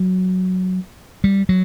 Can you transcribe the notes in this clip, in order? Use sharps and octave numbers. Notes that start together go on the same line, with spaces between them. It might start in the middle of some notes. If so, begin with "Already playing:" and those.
Already playing: F#3
G3
F#3